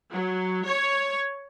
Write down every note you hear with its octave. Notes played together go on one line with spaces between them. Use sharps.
F#3
C#5